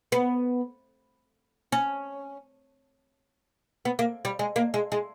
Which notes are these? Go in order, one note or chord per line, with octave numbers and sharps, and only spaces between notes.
B3
C#4
B3
A#3
G3
G#3
A#3
G#3
G#3